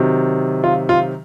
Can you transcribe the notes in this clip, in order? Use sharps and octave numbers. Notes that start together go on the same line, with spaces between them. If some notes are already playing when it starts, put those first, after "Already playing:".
Already playing: C3 D#3 F#3
F4
F4